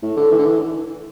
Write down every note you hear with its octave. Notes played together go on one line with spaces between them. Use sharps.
A2
D3
E3
D3
E3